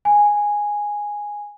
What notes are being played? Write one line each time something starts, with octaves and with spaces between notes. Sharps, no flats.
G#5